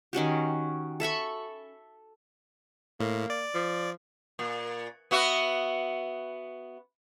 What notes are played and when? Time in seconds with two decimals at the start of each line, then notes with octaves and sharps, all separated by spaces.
0.13 D#3 C#4 F#4 G4
1.00 A4 E5 B5 C#6
3.00 A2 A#3
3.30 D5
3.55 F3
4.39 A#2
5.11 B3 F#4 E5